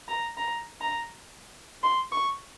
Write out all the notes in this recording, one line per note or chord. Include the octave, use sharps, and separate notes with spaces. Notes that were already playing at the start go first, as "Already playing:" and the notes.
A#5
A#5
A#5
C6
C#6